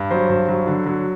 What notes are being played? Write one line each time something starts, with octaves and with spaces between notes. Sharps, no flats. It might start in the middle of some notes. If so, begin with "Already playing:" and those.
Already playing: G2
F#3 C5
G2
F#3
D3
F#3